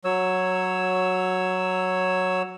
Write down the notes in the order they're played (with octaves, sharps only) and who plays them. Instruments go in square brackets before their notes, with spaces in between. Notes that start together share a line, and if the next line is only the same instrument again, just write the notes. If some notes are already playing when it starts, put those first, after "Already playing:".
[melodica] F#3 C#5 E6